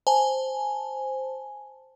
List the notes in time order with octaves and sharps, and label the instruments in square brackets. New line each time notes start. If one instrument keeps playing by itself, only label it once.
[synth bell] C5 G#5 A5